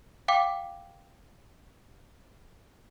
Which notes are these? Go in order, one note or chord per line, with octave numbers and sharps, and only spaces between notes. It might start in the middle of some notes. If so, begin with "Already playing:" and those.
F5 G5 D6